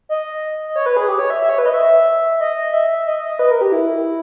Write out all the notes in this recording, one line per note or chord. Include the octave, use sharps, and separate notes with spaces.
D#5
C#5
B4
G#4
G4
C#5
E5
E5
C#5
B4
D#5
E5
D#5
E5
D#5
D#5
D#5
B4
A#4
G4
E4